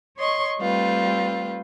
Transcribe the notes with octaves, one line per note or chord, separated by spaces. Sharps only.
C#5 D#5 C6 C#6
G3 A3 C4 F4 B4